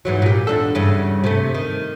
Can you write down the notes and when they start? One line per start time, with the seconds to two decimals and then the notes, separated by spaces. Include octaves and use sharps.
0.05 G#2 E3 F#3
0.22 A#2 G4
0.47 E2 D4 A4
0.75 E2 G2 C#3
1.24 C3 A3
1.55 D#3